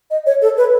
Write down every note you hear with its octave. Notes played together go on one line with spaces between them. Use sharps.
D#5
C#5
A4
B4